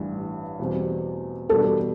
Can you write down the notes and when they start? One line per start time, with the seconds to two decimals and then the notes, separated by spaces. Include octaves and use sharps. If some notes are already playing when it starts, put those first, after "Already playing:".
Already playing: A1 G2 E3
0.59 E2 B2 G3 C4
1.49 E2 B2 G3 D4 A4